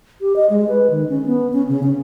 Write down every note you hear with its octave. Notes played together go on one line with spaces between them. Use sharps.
G4
D#5
G#3
B4
D#3
C#4
B3
C#4
C#3
C#4